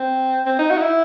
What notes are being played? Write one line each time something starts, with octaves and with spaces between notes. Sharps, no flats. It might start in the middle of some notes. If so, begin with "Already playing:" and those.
Already playing: C4
C4
D#4
F#4
D#4
E4